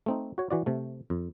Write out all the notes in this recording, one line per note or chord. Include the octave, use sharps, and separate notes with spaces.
A3 C4 D#4
F#4 C#5
E3 F#4 D5
C3 A3
F2